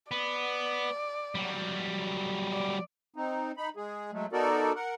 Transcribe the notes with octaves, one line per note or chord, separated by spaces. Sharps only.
B3 D5
F#3 G3
D5
C4 D#4
D#4 B5
G#3 G#4
F#3 G#3 A3
B3 D#4 F#4 A4 A#4 D5
A#4 F#5